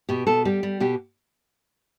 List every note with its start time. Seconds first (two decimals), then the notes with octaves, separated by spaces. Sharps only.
0.09 B2 G4
0.27 B2 A4
0.45 G3 G4
0.63 G3
0.80 B2 G4